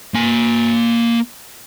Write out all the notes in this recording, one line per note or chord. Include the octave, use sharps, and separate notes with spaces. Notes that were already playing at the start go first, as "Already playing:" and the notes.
A#3 G#5